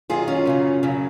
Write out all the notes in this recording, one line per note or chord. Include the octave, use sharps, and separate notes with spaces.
F#2 D#3 F#3 F4 G#4
C#4 F4
F#2 C#3 F#3
F#2 C#3 F#3